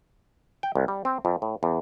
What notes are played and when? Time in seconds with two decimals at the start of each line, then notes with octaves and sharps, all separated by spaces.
0.63 G5
0.75 C2
0.88 G3
1.05 C4
1.25 F2
1.42 A2
1.63 E2